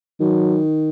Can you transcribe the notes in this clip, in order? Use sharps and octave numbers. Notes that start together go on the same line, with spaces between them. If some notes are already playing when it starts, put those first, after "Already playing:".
D#3 F#3